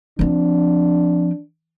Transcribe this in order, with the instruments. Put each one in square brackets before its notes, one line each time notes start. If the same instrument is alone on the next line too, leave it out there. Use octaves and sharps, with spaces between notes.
[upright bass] F3 C4 [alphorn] D4